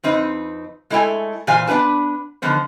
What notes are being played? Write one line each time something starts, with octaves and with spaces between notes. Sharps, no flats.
F2 C4 D#4 B4
G#3 A3 E4 A4 C#5 G#5
A#2 E3 C5 F5 G#5
B3 D4 F4 B4 A5
D3 D#3 F3 B3 C5